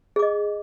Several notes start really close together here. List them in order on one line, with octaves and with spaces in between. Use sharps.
G#4 D6 D#5